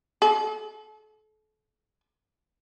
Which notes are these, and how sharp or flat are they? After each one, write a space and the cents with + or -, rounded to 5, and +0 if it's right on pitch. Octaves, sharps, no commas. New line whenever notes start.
A4 -35